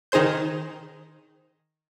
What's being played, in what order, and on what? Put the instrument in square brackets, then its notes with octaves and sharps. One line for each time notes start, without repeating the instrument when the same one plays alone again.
[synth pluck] D#3 D#4 G#4 C5 G6